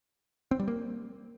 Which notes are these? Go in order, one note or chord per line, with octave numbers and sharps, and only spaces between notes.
C4
G3
A#3